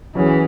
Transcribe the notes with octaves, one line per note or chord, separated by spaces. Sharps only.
E3 F#3 C#4 G#4 C#5